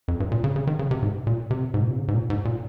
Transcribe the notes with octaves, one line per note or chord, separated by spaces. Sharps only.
F2
G2
A#2
C#3
C#3
D#3
C#3
C3
G#2
A#2
C3
G#2
A#2
C3
C#3
G#2
A#2
G#2
A#2